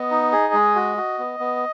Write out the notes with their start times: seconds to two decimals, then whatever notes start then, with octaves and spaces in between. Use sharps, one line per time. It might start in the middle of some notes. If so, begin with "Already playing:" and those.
Already playing: B3 D#5
0.11 D#4
0.32 G#4
0.54 G#3
0.76 F#4
0.97 F#4
1.19 B3
1.40 B3